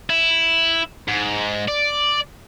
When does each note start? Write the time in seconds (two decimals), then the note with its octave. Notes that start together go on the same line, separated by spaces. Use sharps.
0.10 E4
1.08 G#2
1.68 D5